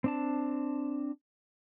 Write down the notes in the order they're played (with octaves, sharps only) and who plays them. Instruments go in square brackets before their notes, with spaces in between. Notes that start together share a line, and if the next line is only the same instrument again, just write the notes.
[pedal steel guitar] C4 D4 A5